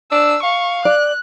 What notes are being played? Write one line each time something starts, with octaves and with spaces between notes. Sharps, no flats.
D4 E6
F5 C#6
D5 F#6